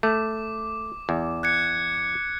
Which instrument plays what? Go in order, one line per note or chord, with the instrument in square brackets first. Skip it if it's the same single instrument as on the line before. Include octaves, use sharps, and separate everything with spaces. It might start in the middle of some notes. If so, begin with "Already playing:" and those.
[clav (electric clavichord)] A3 [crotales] D6
[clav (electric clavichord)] E2
[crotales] F#6 G#6 C#7